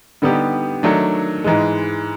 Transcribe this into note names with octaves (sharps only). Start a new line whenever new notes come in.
D3 G3 B3 D#4 G4
D#3 F#3 A3 D4
G#2 E3 G#3